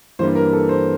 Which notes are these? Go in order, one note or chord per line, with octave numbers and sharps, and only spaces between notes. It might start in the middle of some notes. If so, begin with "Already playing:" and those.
G2 E3 G3 A#3 C5
A#4
A4
C5